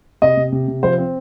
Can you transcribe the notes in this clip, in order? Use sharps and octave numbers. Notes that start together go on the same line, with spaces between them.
C3 D#5
C3
C3
C3
F3 C5
C4